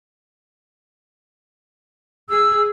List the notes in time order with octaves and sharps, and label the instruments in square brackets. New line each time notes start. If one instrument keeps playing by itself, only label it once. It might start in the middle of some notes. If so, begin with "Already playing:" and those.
[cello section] G#4 [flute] E6